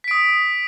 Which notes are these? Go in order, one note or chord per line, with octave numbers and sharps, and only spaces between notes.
D#6 B6 D7